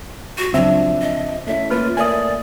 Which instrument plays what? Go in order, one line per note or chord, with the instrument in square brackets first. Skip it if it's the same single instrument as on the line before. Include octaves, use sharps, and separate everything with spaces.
[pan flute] F#4
[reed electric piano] C#2 C4 E5 [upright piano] F3 D4 [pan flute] F#3
[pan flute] D#5
[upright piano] A3 C#4 E4 [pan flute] E5
[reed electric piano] A#3 B4 F6 [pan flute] F4
[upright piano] A3 A#3 E5 [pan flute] D5 [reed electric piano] G#5 D#6